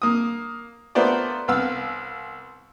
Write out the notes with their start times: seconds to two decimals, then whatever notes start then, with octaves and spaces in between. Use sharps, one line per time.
0.02 A#3 D#6
0.95 A3 B3 F4 A#4 C5 D5
1.48 C2 B3 F5 E6